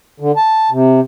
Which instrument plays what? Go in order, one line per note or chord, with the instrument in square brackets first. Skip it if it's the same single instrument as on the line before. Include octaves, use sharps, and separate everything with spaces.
[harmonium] D3
A5
C3